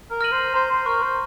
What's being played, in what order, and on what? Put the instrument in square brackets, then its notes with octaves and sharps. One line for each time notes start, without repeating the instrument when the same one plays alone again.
[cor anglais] A#4
[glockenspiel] F6 A#6 D#7 F#7
[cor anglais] C5
[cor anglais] C5 [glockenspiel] A#5
[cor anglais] C5
[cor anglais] A#4 [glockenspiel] C#6 F6
[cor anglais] C5